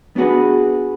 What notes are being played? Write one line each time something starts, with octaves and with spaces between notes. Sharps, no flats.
B3 D4 F#4 G#4 B4